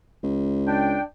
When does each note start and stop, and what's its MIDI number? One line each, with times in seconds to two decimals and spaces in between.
0.23 0.96 37
0.67 1.01 62
0.67 1.01 79